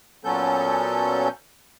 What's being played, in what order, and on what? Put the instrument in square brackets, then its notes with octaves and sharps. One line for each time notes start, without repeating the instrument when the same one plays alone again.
[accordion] A#2 F#3 B3 C#4 A4 G6